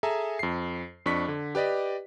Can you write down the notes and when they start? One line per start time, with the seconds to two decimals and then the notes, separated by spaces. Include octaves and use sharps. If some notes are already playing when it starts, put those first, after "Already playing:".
0.03 G#4 A4 E5 G#5 A#5
0.39 F2 C7
1.06 F2 D4 C#6 B6
1.28 D3
1.55 G4 B4 D5 D#5